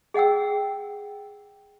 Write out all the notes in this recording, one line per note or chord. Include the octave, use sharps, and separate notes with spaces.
G#4 D#5 F#5 G5 E6